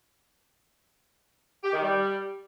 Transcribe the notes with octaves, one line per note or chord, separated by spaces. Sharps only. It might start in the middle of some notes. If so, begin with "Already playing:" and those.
G4
D#3
G3